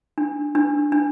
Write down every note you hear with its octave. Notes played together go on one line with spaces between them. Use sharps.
D4
D4
D4